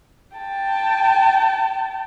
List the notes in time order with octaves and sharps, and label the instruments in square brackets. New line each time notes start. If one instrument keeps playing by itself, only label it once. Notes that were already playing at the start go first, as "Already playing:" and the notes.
[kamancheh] G5 A5